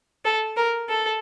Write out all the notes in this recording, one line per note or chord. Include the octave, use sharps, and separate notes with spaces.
A4
A#4
A4